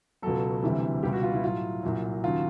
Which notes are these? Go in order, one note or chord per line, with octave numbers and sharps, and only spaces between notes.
C#2 B2 F#3 A4
D2 C3 E3 G3
C#2 B2 G3 G4
F#4
F4
E4
A2 F#3 F4
C2 A#2 F#3
D#2 C#3 F#3 F4